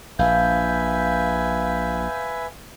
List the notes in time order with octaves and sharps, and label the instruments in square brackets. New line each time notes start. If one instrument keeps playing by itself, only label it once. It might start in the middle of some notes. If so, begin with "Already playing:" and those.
[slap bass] A#1 [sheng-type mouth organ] B4 E5 G#5 [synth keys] F5 G6